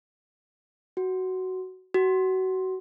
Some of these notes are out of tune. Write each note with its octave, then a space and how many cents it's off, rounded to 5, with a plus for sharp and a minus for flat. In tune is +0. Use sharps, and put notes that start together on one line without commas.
F#4 +10
F#4 +25